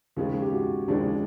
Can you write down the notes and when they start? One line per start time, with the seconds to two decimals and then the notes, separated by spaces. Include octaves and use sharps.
0.16 D#2 C#3 F3 G#3 F4
0.42 G4
0.53 F#4
0.88 D#2 C#3 F3 G#3 D4